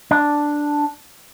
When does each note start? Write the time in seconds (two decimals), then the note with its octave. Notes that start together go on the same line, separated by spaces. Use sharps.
0.11 D4